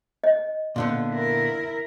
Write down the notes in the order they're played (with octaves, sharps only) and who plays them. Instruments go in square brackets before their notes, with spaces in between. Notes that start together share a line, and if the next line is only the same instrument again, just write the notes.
[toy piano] D#5
[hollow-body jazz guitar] A#2 D3 B3
[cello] E4 A#4